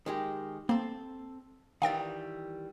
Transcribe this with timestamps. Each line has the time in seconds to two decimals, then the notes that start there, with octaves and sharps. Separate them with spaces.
0.06 D#3 G#3 G4
0.69 A#3 C4 A4
1.82 D#3 E3 G3 F5 G5 A6